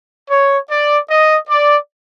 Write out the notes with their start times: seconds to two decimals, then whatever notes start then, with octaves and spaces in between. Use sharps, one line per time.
0.30 C#5
0.70 D5
1.09 D#5
1.49 D5